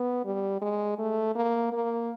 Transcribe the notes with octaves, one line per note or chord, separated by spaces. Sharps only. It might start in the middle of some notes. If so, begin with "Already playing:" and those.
Already playing: B3
G3
G#3
A3
A#3
A#3